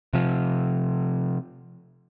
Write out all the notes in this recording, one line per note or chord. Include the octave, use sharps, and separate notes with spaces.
C3 F3